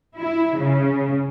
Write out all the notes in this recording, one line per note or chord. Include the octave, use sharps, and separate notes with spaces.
E4
C#3